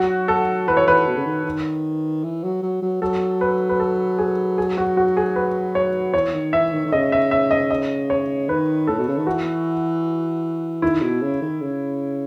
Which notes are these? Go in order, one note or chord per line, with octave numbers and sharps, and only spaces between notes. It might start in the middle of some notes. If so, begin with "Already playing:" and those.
Already playing: F#3 F#4
A4
E3 B4
C#5
E3 B4
B2
C#3
D#3
D#3
E3
F#3
F#3
F#3
F#3 A4
B4
B4
A4
G#4
G#4
F#4
F#4
G#4
B4
C#5
E3 C#5
D#3
E3 E5
D#3
D#3
C#3 D#5
E5
E5
D#5
D#5
C#5
D#3 B4
A2 A4
B2
C#3
D#3
E3 F#4
D#3 E4
B2
C#3
D#3
C#3